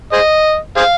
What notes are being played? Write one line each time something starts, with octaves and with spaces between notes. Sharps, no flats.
G#4 C5 D#5
G#4 C5 F5